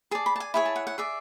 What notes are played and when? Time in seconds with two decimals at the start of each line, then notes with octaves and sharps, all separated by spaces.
0.11 G#4 D5 A5
0.26 B5
0.36 A5
0.40 G#5
0.54 E4 G#4 C#5 G#5
0.65 A5
0.76 F#5
0.87 F#5
0.98 G#4 D5 E5